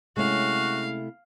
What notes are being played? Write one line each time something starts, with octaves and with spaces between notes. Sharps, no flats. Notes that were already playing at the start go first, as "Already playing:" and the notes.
C3 G#3 A3 C#4 E4 F#4 F5